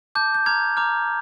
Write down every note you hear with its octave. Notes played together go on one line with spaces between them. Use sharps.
A5 D6 G6
G6
A#5 D6 F6 G#6
A#5 D6 F6